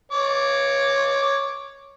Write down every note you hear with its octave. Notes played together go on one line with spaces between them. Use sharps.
C#5 D6